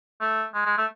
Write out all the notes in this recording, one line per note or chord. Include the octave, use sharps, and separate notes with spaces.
A3
G#3
G#3
A3